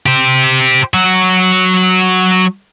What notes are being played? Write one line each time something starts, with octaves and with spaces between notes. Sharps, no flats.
G4 C5
F#3 F#4